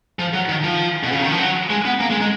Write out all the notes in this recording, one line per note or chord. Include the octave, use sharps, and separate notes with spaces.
F3
F#3
D#3
F3
B2
C#3
D#3
F3
F#3
G#3
B3
A#3
G#3
G#3